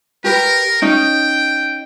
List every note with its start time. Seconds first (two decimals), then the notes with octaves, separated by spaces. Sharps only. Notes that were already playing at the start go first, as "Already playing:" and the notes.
0.24 G4 A#4 B4
0.82 C#4 D#4 G5